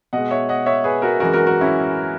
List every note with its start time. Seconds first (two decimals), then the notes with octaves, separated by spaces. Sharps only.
0.13 B2 G#3 D#5 F#5
0.31 C#5 E5
0.49 D#5 F#5
0.66 C#5 E5
0.84 G#4 B4
1.02 F#4 A#4
1.20 F#2 E3 G#3 F#4 A#4
1.34 F#4 A#4
1.47 F#4 A#4
1.61 C#4 E4